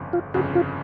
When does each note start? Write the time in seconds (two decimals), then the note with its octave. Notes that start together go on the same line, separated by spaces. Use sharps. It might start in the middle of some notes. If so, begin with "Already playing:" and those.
Already playing: G1 F2 C#3
0.13 F4
0.34 G1 F2 C#3 F#4
0.55 F4